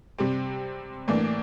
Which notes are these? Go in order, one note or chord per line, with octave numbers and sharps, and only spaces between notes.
C3 G3 C4
A2 E3 A#3 D4